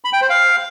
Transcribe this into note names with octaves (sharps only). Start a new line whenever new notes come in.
B5
G5
C5
F5